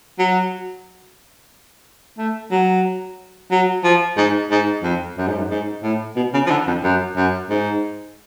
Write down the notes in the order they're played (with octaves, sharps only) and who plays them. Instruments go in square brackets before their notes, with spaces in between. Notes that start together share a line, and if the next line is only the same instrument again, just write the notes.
[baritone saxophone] F#3
A3
F#3
F#3
F3
G#2
G#2
F2
F#2
G#2
F#2
G#2
A2
B2
C#3
F3
D3
F2
F#2
F#2
G#2